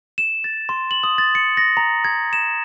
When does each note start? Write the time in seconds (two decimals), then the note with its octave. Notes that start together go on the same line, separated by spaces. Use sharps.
0.18 E7
0.44 A6
0.69 C6
0.91 F#7
1.03 D#6
1.18 A6
1.35 C#7
1.57 A#6
1.77 A#5
2.04 G#6
2.33 E7